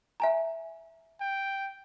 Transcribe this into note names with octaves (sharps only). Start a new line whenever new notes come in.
E5 G#5 A#5
G5